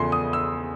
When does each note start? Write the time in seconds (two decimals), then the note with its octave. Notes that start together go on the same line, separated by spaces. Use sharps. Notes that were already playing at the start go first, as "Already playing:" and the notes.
Already playing: E2 C#3 F3 A3 C6
0.12 D#6
0.33 E6